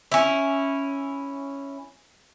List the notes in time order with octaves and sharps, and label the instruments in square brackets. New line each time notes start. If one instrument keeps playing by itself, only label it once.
[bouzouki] C#4 E4